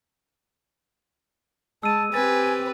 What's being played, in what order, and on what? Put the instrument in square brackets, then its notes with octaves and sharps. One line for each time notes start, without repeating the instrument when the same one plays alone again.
[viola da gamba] G#3 [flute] A5 [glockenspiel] E6 D#7
[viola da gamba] C4 G4 [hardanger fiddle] B4 [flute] G#5 [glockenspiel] A6